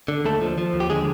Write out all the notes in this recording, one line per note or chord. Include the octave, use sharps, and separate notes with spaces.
D3
D#2 A3 A4
F3
F3
D#2
G4
D3 G#3 G#4